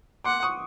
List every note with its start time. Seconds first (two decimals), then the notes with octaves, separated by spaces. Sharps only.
0.24 F#5 C6 D6
0.43 C#6 D#6